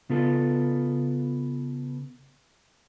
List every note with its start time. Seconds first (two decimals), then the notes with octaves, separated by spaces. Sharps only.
0.10 C#3 B3 F4 A4